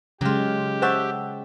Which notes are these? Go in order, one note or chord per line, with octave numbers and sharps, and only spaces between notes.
C#3 F#3 G#3 F4 G4
C5 E5 F#5 G5 A5 C#6